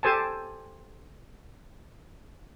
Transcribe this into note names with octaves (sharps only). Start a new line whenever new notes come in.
G4 A4 C5 G#5 A5